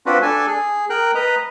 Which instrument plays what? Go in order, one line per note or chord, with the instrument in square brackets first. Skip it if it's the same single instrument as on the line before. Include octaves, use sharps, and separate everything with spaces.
[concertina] C4 D4 F4 F#4 B4
D4 A4 G#5
G#4
A#4 G5 F#6
B4 D#5 A#5